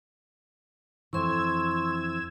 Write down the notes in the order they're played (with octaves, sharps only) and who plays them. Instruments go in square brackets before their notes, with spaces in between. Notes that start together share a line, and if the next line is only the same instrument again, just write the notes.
[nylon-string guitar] F2 E3 [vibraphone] C6 C#6 [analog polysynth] E6 G#6 E7